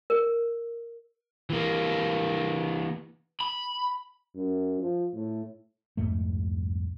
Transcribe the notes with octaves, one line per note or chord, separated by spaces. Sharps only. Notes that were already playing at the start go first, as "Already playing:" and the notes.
A#4
E3 A#3
B5
F#2
F3
A2
C2 F2 G#2 A3